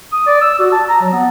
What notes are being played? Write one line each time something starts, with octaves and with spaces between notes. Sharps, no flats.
D#6
D5
E6
F#4
A5
A#5
F#3
B3